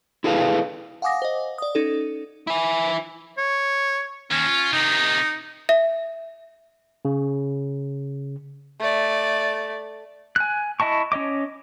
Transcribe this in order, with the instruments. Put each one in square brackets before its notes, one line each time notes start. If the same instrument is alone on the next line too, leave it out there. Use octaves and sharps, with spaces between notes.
[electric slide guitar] E4 G#4 A4 B4 F5
[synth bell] F5 F#5 G#5 D6 D#6 A#6
C5 D#5
D5 D#6
C#4 D#4 A4
[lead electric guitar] E4 G#5
[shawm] C#5
[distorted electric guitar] D#2 D#3 [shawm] C#4
[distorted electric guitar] F4
[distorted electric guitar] C3 D#3 [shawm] D#4
[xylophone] E5
[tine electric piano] C#3
[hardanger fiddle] A3 D5
[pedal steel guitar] G#5 F#6
E4 D#5 A5 C#6
C#4 C#5 D#5 D6